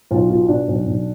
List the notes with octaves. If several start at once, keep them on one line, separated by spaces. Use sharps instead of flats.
B1 F4
B2 F4
B2 D4
B1
B1